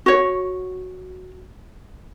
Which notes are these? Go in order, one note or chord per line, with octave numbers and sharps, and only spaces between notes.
F#4 C#5